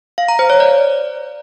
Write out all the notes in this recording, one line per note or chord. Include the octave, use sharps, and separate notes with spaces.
F5
A#5
C5
C#5
D5